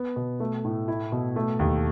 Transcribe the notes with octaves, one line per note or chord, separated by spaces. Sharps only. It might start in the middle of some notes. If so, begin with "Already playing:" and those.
Already playing: B3
B2
A3
A2
E4
B2
A3
D#2